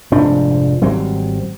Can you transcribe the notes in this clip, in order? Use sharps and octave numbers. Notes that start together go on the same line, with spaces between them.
F1 G#2 F3 D4
G#1 F#3 G3 C4